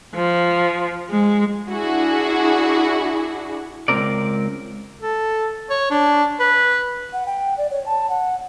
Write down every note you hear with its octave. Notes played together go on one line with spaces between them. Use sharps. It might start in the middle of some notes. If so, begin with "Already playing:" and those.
F3
G#3
D4 E4 F#4 G#4
C#2 F#2 C4 A#4 D5
A4
C#5
D4
B4
F#5
G5
D5
C#5
A5
F#5